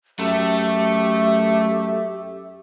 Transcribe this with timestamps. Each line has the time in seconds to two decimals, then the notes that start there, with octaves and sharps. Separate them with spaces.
0.19 F#2 A3 G4 E5